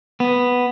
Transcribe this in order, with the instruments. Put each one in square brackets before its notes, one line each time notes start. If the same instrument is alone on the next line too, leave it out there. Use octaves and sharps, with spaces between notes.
[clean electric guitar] B3